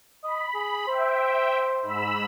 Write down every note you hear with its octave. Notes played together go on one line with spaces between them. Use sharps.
D#5 B5
G#4
C5 E5 G5
G#2 B5 E6